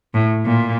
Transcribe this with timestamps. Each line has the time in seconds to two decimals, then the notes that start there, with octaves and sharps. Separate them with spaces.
0.14 A2
0.45 A#2